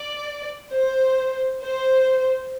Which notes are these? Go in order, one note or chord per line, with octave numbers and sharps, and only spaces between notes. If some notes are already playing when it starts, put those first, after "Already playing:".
Already playing: D5
C5
C5